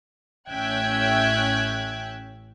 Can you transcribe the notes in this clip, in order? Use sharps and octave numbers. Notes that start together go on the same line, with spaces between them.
A1 C#4 E5 G5 F#6 G#6